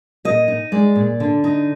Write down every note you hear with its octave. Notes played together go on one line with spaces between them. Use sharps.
A#2 D#5
D#4
G#3 D5
A#2
D3
D#4